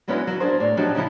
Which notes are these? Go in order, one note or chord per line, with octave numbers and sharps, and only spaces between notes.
F#3 G#3 B3 C#4 D4 E4
F#3
D4 G#4 A#4 C5
A2 D5
F3 F#3 D4 D#4 F#4 G4
C#3 F3 D#4 E4